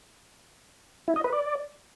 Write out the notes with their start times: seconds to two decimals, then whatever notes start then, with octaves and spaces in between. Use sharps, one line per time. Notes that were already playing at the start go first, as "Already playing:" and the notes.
1.08 E4
1.16 D#5
1.24 B4
1.32 D5